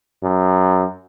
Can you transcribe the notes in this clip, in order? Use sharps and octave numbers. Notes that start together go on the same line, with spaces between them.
F#2